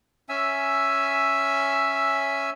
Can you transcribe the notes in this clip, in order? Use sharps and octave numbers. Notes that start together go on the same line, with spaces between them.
C#4 E5 G#5 E6